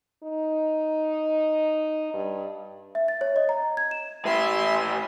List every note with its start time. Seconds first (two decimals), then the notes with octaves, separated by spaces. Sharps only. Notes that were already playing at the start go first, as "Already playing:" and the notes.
0.23 D#4
2.14 G2
2.95 E5
3.08 A6
3.21 C#5
3.36 D#5
3.49 A#5
3.77 G#6
3.91 E7
4.25 A2 B4 E5 C6